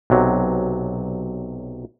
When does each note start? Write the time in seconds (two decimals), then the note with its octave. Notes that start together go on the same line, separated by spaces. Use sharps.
0.10 B1 C3 F#3